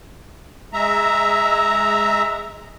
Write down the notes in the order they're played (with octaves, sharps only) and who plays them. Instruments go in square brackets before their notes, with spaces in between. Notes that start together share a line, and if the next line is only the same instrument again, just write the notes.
[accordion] G#3 E5 A#5